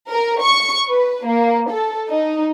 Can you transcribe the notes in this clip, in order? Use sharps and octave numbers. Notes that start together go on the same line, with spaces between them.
A#4
C#6
B4
A#3
A4
D#4